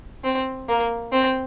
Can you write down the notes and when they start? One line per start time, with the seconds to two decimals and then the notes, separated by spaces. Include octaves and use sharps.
0.24 C4
0.68 A#3
1.12 C4